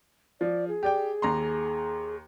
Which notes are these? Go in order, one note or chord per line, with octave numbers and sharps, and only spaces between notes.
F3 D5
G#4
G4 D5 G5
D#2 A#5 C6